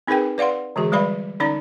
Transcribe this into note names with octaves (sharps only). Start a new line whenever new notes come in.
C4 D#4 G#4 A#4 B4 G5
B4 D5 F5 F#5 C6
D3 E3 G#3 F#4 G#4
G3 G#3 B4 D5 F5 B5
D3 C#4 D#4 D5 A#5